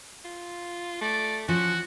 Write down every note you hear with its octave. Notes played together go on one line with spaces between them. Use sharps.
F4
A3 D5
F3 C#4 F#4